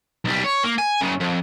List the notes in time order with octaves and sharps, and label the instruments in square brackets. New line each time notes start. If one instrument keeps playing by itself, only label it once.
[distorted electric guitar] B1 G3
C#5
A#3
G#5
F#2 C#3
F2